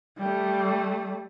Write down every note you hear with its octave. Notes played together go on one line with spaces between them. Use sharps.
G3 A3